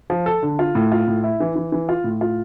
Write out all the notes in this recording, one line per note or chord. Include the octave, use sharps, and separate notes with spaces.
F3
A4
D3
F4
A2
F4
A2
E4
E3
E3
E3
F4
A2
F4